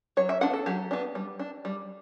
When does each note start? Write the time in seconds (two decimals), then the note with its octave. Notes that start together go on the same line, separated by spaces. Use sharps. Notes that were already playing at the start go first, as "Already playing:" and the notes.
0.17 F#3 C#5
0.29 E5
0.41 B3 D4 F#5
0.54 A4
0.66 F#3 G4
0.91 B3 D4
1.15 G3
1.39 D4
1.65 G3